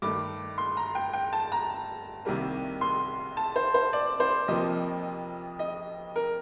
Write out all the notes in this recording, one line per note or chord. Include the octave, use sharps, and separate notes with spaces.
G2 D#3 A3 D6
C6
A#5
G5
G5
A5
A#5
C2 C3 D#3 G3 A#3
C6
A5
C5
C5
D5
C5
F2 C3 F3 A#3 D#5
D#5
A#4